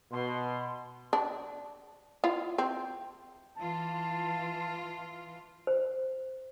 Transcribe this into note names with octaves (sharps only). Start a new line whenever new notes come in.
B2 C6
D4
E4 F4
C4
E3 F4 A5
C5